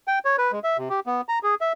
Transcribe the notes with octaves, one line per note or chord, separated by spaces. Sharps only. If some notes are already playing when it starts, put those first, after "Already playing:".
G5
C#5
B4
G#3
E5
C3
G4
B3
A#5
G#4
E5